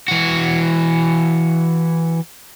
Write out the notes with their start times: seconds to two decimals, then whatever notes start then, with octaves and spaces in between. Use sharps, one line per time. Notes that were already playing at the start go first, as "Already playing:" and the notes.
0.08 E3 F#4